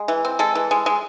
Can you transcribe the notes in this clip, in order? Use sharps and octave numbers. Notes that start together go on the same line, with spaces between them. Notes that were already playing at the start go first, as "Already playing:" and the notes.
Already playing: G#3
E3
C4
G#3 A4
E3
G#3
G#3